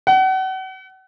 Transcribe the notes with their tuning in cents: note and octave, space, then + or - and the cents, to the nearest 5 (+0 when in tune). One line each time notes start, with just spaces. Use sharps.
F#5 +35